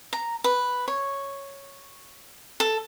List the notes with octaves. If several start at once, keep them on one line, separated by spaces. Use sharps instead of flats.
A#5
B4
C#5
A4